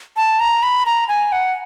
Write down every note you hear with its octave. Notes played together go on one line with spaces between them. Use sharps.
A5
A#5
B5
A#5
G#5
F#5